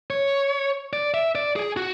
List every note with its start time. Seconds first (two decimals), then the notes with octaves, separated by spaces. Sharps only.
0.11 C#5
0.93 D5
1.14 E5
1.35 D5
1.56 G#4
1.77 F#4